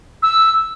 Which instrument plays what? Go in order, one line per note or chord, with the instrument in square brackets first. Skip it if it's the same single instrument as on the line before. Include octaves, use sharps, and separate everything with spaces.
[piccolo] E6